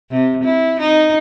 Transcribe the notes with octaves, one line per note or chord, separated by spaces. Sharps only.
C3
E4
D#4